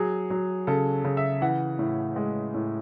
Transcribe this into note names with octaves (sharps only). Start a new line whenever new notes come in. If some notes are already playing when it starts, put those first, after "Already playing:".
Already playing: F#3 G#4
F#3
C#3 A4
C#3
E5
E3 F#5
A2
G#3
A2